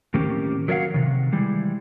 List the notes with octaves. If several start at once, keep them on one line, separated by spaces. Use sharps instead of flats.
A2 D#3 A#3 C4 C#4 G4
F#3 A#4 C#5 D5 F5 F#5
C3 D#3
E3 G3 G#3